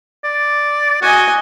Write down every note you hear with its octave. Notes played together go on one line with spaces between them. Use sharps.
D5
F#4 D#5 G#5